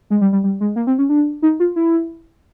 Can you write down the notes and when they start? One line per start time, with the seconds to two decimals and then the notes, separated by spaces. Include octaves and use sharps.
0.10 G#3
0.21 G3
0.33 G3
0.44 G3
0.60 G#3
0.76 A#3
0.87 C4
0.98 C#4
1.09 D4
1.42 D#4
1.60 F4
1.76 E4